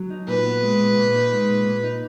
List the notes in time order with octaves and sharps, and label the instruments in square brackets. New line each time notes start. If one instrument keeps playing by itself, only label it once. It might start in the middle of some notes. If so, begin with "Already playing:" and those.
Already playing: [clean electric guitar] F#3
D#4
[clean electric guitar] A#2 [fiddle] B4
[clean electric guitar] B3
G#3
A#2
A#2
D#4
G#3
A#2
A#2
D#4